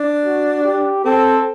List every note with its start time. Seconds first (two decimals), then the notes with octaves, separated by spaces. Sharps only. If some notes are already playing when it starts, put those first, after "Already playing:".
Already playing: D4
0.26 F#4
0.65 G4
1.04 C4 A4